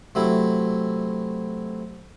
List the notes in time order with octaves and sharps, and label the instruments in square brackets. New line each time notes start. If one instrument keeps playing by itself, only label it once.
[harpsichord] C3 F#3 A3 E4